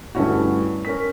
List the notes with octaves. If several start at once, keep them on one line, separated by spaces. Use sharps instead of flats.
G2 D3 A3 C#4 E4 F#4
C#4 A#4 B6